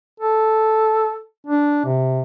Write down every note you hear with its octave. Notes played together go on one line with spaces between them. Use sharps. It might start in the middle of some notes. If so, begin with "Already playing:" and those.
A4
D4
C3